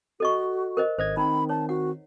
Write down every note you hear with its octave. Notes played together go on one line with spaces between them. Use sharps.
F#4 A4 D#5 C#6
A#4 C5 D#5
G#1 C5 D#5 G#6
D#3 C4 D#4 A#5 B5
C#5 A5
F#4 F#5